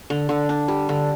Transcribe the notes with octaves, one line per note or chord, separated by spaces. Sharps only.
D3
D3
D4
G3
D3